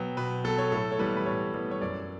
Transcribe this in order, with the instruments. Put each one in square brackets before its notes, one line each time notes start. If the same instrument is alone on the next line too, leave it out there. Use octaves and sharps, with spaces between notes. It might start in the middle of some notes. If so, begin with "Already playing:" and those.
Already playing: [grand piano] B2 F#3 B3 G5
B2 B4
F#3 B3 A4
C#5
A2 A4
C#5
E3 G3 B3 B4
B4
A2 C#5
E3 G3 B3
C#5
F#2 D5